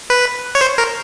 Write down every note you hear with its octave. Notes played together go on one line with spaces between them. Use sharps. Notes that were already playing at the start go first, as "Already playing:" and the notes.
B4
C#5
C5
A#4